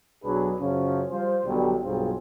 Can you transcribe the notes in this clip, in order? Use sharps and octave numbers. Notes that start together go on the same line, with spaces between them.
B1 F#3 D4 G#4 B4
F#2 C#3 F3 C#4
F3 G3 F4 C5
B1 B2 D3 G3
B1 G2 C4 F4 G#4